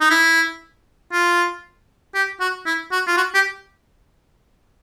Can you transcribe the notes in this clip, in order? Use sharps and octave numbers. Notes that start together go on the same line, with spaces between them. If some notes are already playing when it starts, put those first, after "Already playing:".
D#4
E4
F4
G4
F#4
E4
F#4
F4
F#4
G4